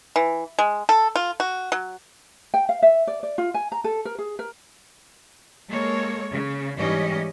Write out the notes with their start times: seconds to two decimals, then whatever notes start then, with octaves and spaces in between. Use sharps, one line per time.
0.16 E3
0.59 G#3
0.89 A4
1.16 F4
1.40 F#4
1.72 F#3
2.54 G5
2.69 F5
2.82 E5
3.07 D5
3.23 D5
3.38 F4
3.54 G#5
3.72 A#5
3.84 A4
4.05 A#4
4.18 G#4
4.39 A#4
5.68 G#3 A#3 A4 C#5
6.31 C#3
6.77 G#2 E3 G3 C#4 G4 D#5